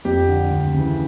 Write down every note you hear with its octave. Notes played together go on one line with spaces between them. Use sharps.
F2 G4
D3
D2
C#3 E3